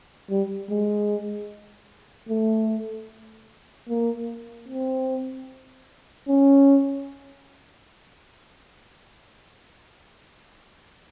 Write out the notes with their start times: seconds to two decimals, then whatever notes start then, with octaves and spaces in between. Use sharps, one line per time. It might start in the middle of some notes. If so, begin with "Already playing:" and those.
0.30 G3
0.69 G#3
2.29 A3
3.89 A#3
4.68 C4
6.28 C#4